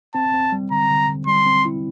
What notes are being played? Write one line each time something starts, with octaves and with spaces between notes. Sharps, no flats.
C4 A5
C4
G3
D3 A#5
D3
D3
G3 C6
C4
E4